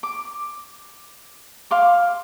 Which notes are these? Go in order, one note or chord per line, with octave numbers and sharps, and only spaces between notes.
D6
F5 C6 D6